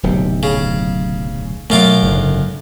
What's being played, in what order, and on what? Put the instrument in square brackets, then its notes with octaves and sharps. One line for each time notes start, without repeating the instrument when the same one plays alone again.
[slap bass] D1 B1 C3
[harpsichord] C#3
[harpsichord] F#2 F4 D6 [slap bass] B2 A3
[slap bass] F#1 G#2 D3